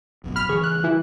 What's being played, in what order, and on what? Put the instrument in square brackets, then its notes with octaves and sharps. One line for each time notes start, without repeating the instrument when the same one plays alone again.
[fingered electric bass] G#1 F#2 B2
[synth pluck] B5 B6 [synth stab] F6
[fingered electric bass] C#3 E3 G3 [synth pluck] G#4 C#6
[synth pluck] F#6
[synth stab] E3